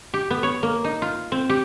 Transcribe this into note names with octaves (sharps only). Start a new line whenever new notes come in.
G4
B3
C#5
A#3
D#4
F4
C4
G4